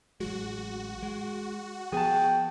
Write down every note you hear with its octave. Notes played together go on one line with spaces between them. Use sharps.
A1 F#3 G#3 F#4
G#3
F3 B3 G#4 G5 A5